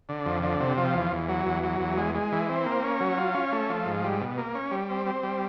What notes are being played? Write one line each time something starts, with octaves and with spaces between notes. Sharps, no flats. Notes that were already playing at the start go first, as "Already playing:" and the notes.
D3
F2
D3
C3
F3
E2
E2
F#3
E2
F#3
E2
G#3
G#3
E3
C4
A#3
C#4
F#3
F4
C#4
A3
F3
G#2
G3
B2
A#3
C#4
G3
C4
C4
G3